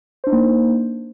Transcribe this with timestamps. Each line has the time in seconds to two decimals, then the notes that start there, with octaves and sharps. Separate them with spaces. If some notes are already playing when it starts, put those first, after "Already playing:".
0.24 C5
0.27 D4
0.30 D#4
0.33 A#3